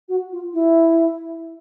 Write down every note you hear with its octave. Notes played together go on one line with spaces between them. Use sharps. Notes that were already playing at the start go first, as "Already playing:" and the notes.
F#4
F4
E4